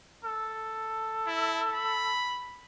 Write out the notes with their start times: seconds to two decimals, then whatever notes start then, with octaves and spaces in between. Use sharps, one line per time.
0.25 A4
1.27 E4
1.74 B5